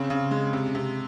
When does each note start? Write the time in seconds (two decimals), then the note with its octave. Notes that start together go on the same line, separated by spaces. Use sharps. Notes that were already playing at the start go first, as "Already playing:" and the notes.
Already playing: C#3 C4
0.10 C#3
0.31 G#3
0.53 C3
0.75 C3